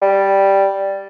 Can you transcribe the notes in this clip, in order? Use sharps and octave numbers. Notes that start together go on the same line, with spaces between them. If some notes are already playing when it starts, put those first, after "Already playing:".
G3